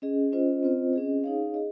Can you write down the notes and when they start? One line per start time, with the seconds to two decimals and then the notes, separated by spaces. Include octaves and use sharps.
0.02 C#4 G#4 D#5
0.32 C#4 F4 C5 D#5
0.63 C4 F4 C5 D#5
0.93 C#4 G#4 D#5
1.24 D#4 G#4 C#5 F5
1.54 G#4 D#5